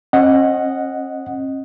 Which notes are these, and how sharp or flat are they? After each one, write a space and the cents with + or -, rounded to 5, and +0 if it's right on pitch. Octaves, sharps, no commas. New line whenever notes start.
C#4 -45 D#5 +0 F#5 +0